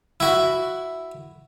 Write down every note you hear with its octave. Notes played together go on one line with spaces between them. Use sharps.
E4 F#4